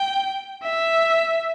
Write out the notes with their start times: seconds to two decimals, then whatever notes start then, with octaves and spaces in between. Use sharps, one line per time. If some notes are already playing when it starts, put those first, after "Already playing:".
Already playing: G5
0.63 E5